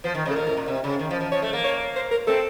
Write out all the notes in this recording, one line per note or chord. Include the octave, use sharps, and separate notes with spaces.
F3 C5
D#3
C#3
A4
A#2 A#4
A2
A#2
C3
C#3
D#3
F3
F3
F3 C#5
A3
A#3
C#5
C5
A#4
C4 A4